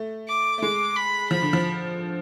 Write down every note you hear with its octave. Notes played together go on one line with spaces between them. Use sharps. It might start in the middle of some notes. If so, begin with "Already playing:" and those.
Already playing: A3
D6
A3
G#3 D6
B5
F3 B5
D3
F3